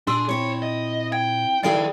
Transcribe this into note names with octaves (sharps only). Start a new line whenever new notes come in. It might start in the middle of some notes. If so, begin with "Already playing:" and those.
A#2 D4 G#4 C6 E6
C4 E4 C#5
D#5
G5 G#6
D#3 E4 G#4 A4 D5 F5 G5